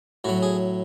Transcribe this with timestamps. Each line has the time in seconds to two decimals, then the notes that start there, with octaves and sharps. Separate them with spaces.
0.24 A2 F#3 F#4
0.43 G#4